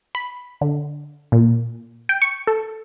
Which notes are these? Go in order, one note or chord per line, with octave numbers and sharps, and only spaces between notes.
B5
D3
A#2
G5
C#6
A4